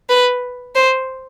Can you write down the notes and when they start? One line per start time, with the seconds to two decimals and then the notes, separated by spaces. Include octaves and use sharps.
0.10 B4
0.75 C5